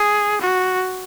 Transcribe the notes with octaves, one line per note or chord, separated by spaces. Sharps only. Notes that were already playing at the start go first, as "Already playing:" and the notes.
Already playing: G#4
F#4